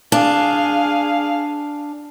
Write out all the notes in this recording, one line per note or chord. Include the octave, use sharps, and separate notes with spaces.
D4 G#4 F5